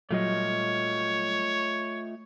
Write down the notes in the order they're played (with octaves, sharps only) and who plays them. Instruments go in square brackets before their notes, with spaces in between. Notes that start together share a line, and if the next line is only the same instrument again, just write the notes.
[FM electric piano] A#2 F#3 G3 [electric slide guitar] A3 F4 D#5 [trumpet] C#5